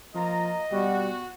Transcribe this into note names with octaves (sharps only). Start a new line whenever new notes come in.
F3 A#3 F4 D#5 A#5
B2 G3 F#4